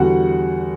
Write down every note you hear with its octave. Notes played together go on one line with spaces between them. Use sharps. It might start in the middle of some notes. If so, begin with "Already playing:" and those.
Already playing: E2 D3 G3 F#4 F#5